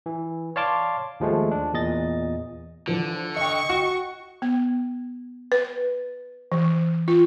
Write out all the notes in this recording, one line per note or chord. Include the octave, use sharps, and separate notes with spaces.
E3
C#5 D5 F5 A5 C6 D6
D#2 F3 G#3 A3
D4
E2 A#2 D#5 A6
D3 E3 F3
D#5 G5 C#6
F#4
B3
B4
E3
F4